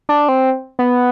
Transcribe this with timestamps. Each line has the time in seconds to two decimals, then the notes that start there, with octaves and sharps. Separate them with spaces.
0.09 D4
0.29 C4
0.79 B3